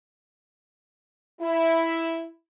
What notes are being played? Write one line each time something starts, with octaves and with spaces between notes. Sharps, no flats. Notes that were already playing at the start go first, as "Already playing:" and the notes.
E4